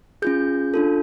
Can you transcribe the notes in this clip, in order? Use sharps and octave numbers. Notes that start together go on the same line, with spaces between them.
C#4 F4 G#4 G6
D4 F4 A4